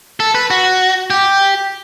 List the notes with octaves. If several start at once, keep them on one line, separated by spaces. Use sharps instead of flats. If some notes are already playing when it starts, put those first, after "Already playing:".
A4
B4
F#4
G4